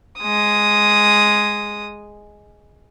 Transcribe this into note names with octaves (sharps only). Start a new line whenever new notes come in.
G#3 D#6